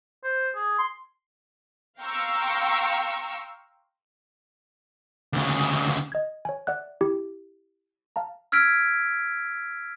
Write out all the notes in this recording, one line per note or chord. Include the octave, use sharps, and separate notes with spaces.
C5
G#4
C6
F5 G5 A#5 C6 C#6 E6
D2 C#3
D#5 G#6
C#5 G#5
D5 E5 F#5 F#6
E4 G4
F5 A5 A#5
E6 F6 G#6 B6 D7